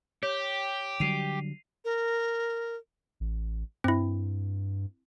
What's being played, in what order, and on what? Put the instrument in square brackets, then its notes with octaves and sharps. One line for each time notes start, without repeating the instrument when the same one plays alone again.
[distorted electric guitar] G4 [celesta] C#5
[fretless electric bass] D3 F#3 G3 [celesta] C7 D#7 F7
[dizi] A#4
[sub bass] A1
[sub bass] G2 [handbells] C4 E4